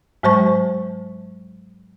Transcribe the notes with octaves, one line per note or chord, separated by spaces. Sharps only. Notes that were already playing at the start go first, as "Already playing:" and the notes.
G#2 F#3 G#3 C5 A5 C#6